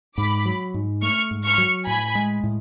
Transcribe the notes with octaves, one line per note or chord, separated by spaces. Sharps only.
G#2 B5 D6
F#3
G#2
A3 C#6 F6
G#2
C#6 F6
F#3
A2 G#5 B5
G#3
A2